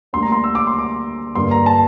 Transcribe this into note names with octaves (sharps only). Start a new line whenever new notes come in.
D2 D3 G3 A#3 C6
A#5
C6
E6
D6
C6
D6
G2 D3 G3 A#3 C6
A#5
A5